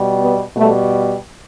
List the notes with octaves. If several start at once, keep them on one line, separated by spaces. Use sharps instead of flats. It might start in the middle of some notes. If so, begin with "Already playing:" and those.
Already playing: B2 G3
B3
B2 G3 A3